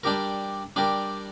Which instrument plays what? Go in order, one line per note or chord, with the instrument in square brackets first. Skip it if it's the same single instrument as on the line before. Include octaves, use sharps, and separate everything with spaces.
[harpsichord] G3 D4 G4 A#4
G3 D4 G4 A#4